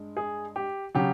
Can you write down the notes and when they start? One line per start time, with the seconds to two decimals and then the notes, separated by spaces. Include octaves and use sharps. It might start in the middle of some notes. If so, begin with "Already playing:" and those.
Already playing: G2 G#3
0.17 G#4
0.56 G4
0.95 C#3 F#3 G4